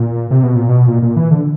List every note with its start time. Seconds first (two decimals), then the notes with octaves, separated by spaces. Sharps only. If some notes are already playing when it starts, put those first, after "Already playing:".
Already playing: A#2
0.31 C3
0.43 B2
0.56 A#2
0.69 B2
0.87 A#2
1.02 A#2
1.16 E3
1.31 D3